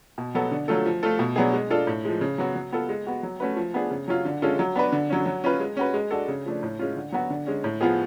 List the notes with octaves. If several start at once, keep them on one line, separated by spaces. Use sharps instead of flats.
B2
F#3 B3 F#4 A4
D3
F#3 A3 F4 A4
F3
A3 F4 A4
B2
F#3 B3 D4 G#4
G#3
D4 F4 A4
A2
F3 G#3
C#3
F#3 B3 F#4
F#3
B3 F4 A4
G#3
B3 F#4
F#3
A3 C#4 F#4 B4
F3
B3 D4 G#4
C#3
F#3 C#4 F4
D3
G#3 C#4 F4 A4
F#3
B3 D4 F#4 B4
D3
F#3 C#4
F#3
C#4 F4 B4
G#3
C#4 F#4 B4
G#3
D4 F#4 A4
C#3
F3 A3 D4
A2
G#3 C#4 F4
D3
F#3 B3 F#4 B4
D3
G#3 C#4
A2
F3 B3 F4 G#4